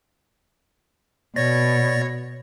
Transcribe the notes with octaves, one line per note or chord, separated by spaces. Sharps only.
B2 C#5 D5 A6 A#6